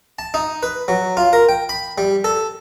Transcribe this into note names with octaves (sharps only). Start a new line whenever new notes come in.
A5
D#4
B4
F#3
F4
A#4
G5
B5
G3
A4